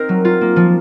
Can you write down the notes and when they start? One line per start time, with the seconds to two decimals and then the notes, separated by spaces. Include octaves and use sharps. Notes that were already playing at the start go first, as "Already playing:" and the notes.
Already playing: C4 D#4 A#4
0.09 F#3
0.25 F4
0.41 A#3
0.56 F3